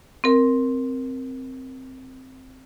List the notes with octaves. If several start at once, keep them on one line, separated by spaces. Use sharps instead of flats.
C4 A#4